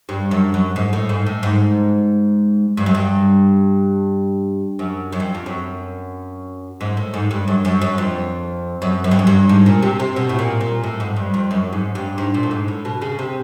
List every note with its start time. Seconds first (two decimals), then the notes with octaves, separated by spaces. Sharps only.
0.09 G2
0.31 F#2
0.54 F#2
0.76 G#2
0.93 A2
1.09 G#2
1.26 A2
1.43 G#2
2.77 G2
2.86 F#2
2.95 G2
4.79 F#2
5.13 F#2
5.20 F2
5.35 F2
5.46 F#2
6.81 G#2
6.97 A2
7.14 G#2
7.31 G2
7.48 F#2
7.65 F#2
7.82 F#2
7.98 F2
8.82 F#2
9.04 F#2
9.11 G2
9.19 F#2
9.27 G2
9.49 G#2
9.66 A#2
9.82 C3
10.00 C3
10.16 B2
10.29 A2
10.39 A#2
10.61 A#2
10.84 A2
11.00 G#2
11.16 G2
11.34 F2
11.51 F#2
11.73 G#2
11.95 G2
12.18 G#2
12.34 A#2
12.43 A2
12.51 G#2
12.68 A2
12.85 B2
13.02 C#3
13.19 C3